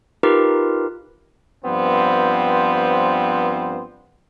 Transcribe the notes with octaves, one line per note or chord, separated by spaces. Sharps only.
D#4 F4 G4 A#4 B4
G2 F3 B3 C4 C5